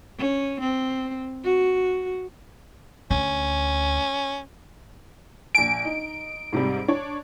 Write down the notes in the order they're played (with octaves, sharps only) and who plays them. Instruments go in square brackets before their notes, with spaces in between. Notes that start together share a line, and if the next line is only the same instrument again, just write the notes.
[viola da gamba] C#4
C4
F#4
[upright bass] D2 [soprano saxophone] C#4
[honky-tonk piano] A#1 G#5 [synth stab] D7
[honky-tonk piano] D#4
G#2 C3 G3
D4 C#5